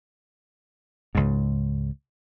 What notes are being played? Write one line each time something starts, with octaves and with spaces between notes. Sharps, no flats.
C#2 G#2